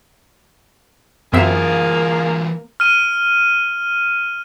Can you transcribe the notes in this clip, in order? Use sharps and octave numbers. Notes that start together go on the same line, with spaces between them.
F#2 E3 A#3 C4 F4 G#4 A#4 E5
F6 D#7